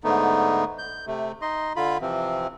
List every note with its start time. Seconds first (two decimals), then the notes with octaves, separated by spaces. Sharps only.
0.04 G#2 D3 A3 B3 D#4
0.78 G6
1.07 C3 A3
1.42 D#4 D#5 C6
1.76 D3 F4 B5
2.01 C3 E3 F3 C4